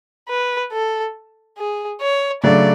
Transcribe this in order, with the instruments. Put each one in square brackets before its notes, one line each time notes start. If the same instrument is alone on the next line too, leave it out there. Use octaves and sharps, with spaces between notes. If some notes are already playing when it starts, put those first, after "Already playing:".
[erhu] B4
A4
G#4
C#5
[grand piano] C#3 F#3 A3 D4 [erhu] D5